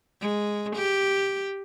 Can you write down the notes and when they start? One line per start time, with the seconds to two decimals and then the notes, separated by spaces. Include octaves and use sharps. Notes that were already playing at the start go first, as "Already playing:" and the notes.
0.21 G#3
0.76 G4